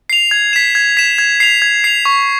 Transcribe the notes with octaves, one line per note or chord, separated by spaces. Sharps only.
C7 F7
G#6
B6 E7
G#6
B6 E7
G#6
C7 F7
G#6
C7 F7
C#6